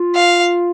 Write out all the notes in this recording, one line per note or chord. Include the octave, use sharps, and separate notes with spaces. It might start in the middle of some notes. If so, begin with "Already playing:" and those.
Already playing: F4
F5